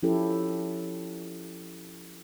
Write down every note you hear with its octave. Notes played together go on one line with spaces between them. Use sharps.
F3 C#4 E4 G4 A4